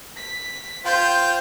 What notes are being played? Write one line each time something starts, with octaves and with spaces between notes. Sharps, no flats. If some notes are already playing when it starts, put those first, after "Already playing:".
B6
F4 C5 G5 G6